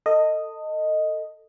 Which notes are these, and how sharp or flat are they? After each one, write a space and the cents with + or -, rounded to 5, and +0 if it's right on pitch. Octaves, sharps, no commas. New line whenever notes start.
A4 +25 D#5 +0